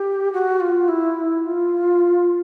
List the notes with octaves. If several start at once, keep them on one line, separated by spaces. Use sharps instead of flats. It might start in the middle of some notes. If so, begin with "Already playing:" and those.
Already playing: G4
F#4
F4
E4
F4